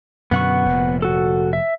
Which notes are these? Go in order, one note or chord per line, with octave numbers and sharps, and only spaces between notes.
F#2 B2 D3 B3 F#5 C#6
F1 A#2
F#4 A4
E5